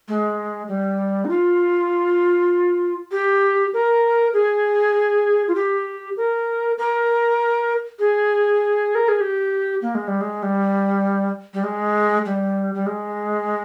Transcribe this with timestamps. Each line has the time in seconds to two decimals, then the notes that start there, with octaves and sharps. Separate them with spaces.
0.08 G#3
0.68 G3
1.25 D#4
1.30 F4
3.12 G4
3.74 A#4
4.33 G#4
5.48 F4
5.55 G4
6.17 A#4
6.78 A#4
7.99 G#4
8.95 A#4
9.08 G#4
9.21 G4
9.82 A#3
9.95 G#3
10.08 G3
10.21 G#3
10.43 G3
11.54 G3
11.63 G#3
12.25 G3
12.75 G3
12.86 G#3